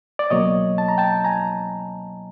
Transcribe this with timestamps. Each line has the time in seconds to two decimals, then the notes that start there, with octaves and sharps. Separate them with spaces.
0.19 D5
0.30 C#2 B2 F#3 A#3 C#5 D#5
0.78 A5
0.89 A#5
0.98 G5 A5
1.24 G#5 A#5